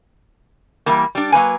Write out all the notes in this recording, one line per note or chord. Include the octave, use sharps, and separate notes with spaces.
E3 G3 A#3
G3 D4
F#3 A#3 B4 G#5